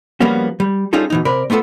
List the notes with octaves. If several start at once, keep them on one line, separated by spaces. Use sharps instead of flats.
F3 G3 A#3 B3 C#4 F#4
G3
G3 C#4 D#4 F4 G#4 A4
B2 E3 D#4
C3 A#4 D5 B5
A3 B3 F4 F#4 A4